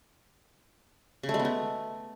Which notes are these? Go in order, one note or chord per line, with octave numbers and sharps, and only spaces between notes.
C#3
A3
G#3
B3
A3